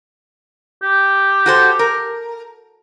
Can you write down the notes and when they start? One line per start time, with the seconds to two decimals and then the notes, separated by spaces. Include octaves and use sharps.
0.82 G4
1.46 F#4 A4 C5
1.79 A#4